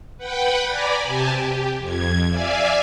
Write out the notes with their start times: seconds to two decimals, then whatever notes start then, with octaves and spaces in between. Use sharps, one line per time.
0.18 B4 F#5 G5 B5
0.68 D5 G#5 A#5 B5 D6
1.04 C3 G4 G#5 A5
1.40 G4
1.79 F2 G#6
2.29 D5 E5 F5 G#5